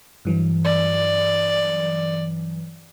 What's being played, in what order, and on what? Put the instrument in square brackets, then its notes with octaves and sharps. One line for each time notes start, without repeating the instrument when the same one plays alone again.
[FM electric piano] G2 E3 F#3
[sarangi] D5